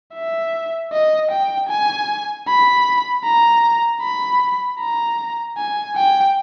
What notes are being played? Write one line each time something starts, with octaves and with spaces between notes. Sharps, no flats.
E5
D#5
G5
G#5
B5
A#5
B5
A#5
G#5
G5